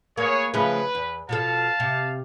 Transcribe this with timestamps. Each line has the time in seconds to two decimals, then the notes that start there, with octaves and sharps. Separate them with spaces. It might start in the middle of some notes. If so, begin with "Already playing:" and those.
0.17 A#3 G#4 B4 C#5
0.54 C#3 F3 A3 B4
0.95 E2
1.29 B2 F3 A4 F5 A5
1.80 C3